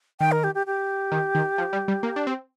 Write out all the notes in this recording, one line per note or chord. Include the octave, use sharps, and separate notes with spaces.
D#3 G5
A#4
G4
G4
G4
D#3
D#3
F3
G3
G3
A#3
D4
C4